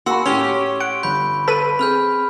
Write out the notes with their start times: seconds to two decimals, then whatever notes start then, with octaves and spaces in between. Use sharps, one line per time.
0.06 A#3 F#4 G#5 B5 C6 E6 C#7
0.26 A2 C#4 G4 C6 C#6 G7
0.80 F#5 D7
1.03 G1 B5 G6
1.48 A4 B4 B6 D#7
1.79 C4 G#4 B5 F6 G6